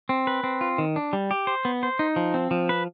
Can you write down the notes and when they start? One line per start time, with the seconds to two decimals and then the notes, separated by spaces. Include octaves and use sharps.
0.09 C4
0.27 B4
0.44 C4
0.61 F4
0.78 D#3
0.96 D4
1.13 G3
1.31 G4
1.47 C5
1.65 B3
1.83 C5
1.99 D#4
2.16 F3
2.34 C4
2.51 F3
2.69 B4